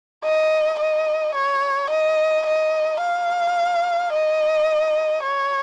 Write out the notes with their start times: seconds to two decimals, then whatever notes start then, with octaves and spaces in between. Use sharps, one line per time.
0.24 D#5
0.79 D#5
1.35 C#5
1.90 D#5
2.46 D#5
3.01 F5
4.12 D#5
5.23 C#5